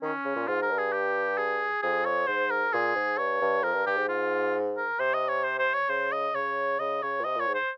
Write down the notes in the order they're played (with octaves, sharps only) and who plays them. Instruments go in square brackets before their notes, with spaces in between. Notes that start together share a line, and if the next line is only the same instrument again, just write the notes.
[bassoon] D#3 [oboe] C#4
[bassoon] C#3
A#2
[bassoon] G#2 [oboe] F4
[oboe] A#4
[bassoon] G2
[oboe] G#4
G4
G#4
[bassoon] F2 [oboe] G#4
[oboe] C#5
[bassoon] G#2 [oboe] C5
[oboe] A#4
[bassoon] A#2 [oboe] G#4
[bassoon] G#2
[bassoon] G2 [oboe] C#5
[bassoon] G2
[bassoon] F2 [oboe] A#4
[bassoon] G2
[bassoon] G2 [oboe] G4
[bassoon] G#2
[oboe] F4
A#4
[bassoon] C3 [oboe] C5
[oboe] D#5
C#5
C5
C5
C#5
[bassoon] C#3 [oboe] C5
[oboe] D#5
[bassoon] C#3 [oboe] C#5
[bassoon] C#3 [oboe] D#5
[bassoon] C#3 [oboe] C#5
[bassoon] A#2
[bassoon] C3 [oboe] D#5
[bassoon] A#2 [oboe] C#5
[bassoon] G#2
[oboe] C5